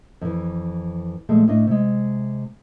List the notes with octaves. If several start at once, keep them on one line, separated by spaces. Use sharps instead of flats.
F2 E3
A#2 F3 G#3 A3
A2 D4 D#5
C3 G#3